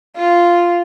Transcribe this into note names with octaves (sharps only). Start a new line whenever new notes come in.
F4